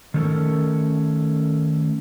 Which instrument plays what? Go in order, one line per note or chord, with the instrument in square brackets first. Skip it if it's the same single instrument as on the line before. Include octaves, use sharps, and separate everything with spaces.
[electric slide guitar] D#3 A3 C#4 F4 A4 A#4